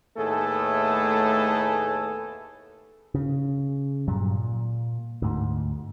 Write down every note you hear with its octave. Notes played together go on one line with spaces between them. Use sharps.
D#2 A2 A3 B3 G#4 A4
C#3
G2 A#2 F#3 G3
A#2
D2 G#2